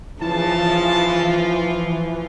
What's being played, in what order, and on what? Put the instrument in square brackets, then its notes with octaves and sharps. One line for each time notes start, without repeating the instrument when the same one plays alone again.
[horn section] C#3 A5 [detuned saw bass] E3 [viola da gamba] F3 F4